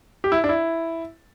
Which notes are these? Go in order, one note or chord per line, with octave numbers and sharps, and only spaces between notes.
G4
E4
D4
E4